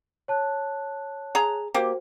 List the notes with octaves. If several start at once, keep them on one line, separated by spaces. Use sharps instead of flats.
C#5 A5 F#6
G#4 A#5
A#3 F#4 G4 C5